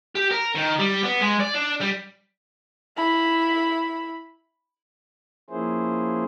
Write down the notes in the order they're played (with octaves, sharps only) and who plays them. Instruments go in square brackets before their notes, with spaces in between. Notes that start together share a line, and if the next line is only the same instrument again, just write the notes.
[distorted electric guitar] G4
A#4
D#3
G3
B3
G#3
D5
D4
G3
[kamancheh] E4 B5
[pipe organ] F3 A#3 C#4 E4 G#4 C5